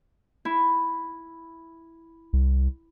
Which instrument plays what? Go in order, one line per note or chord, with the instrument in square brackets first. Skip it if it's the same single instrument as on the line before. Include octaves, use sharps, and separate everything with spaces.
[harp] E4
[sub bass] C2